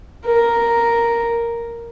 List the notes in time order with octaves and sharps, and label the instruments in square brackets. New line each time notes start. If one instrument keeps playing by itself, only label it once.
[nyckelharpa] A#4